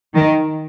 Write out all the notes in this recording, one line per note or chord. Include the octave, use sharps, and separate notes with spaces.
D#3